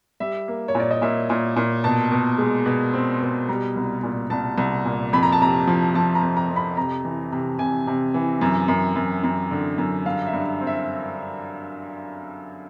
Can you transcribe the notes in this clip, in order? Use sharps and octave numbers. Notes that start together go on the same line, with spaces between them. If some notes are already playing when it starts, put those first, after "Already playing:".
G3 E5
A#3
C#5
A#2 D5
D#5
A#2 E5
A#2
A#2
B2 A5
B2
G#3
B2
C4
B2
G3 A#5
C2
A#2
C2 A5
C2
A#2
F2 B5
A#5
A5
C3 A#5
F3
F3 A5
A#5
F2
A#5
F2
B5
C3 A#5
E3
C3
C3 G#5
C3
E3
F#2
F#2
F#2
F#2
D3
F#2
G2 F5
E5
G2
C4
E5